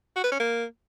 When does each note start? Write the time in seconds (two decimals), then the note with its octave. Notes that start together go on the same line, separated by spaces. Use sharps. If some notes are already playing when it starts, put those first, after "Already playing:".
0.16 F#4
0.24 B4
0.32 C#4
0.40 A#3